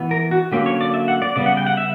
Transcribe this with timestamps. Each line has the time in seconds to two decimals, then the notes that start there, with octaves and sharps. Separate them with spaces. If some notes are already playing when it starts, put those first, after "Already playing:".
Already playing: E3 B3
0.11 A#4
0.31 F#4
0.52 D3 F#3 A#3 C#4 G4
0.66 C#5
0.81 D5
0.94 E5
1.08 F#5
1.22 D5
1.36 C#3 G3 B3 D5
1.46 F#5
1.57 G5
1.67 F#5
1.77 E5